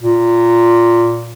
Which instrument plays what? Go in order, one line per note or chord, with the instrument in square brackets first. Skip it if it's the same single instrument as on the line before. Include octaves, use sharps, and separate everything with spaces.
[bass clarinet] A#2